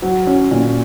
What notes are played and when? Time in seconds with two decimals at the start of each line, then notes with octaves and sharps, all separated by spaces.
0.02 F#3
0.27 C#4
0.51 A#2